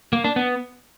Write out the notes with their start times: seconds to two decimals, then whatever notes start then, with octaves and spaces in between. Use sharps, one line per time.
0.13 A#3
0.24 D4
0.36 B3